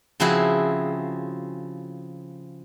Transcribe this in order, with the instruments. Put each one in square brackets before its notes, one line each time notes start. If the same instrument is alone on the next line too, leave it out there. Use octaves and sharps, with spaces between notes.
[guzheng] C#3 F3 C4 E4 F#4 G#4